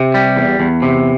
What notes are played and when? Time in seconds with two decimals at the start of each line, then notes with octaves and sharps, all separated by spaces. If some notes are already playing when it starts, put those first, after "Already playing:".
Already playing: C3
0.14 G3
0.36 E2
0.60 E2
0.82 C3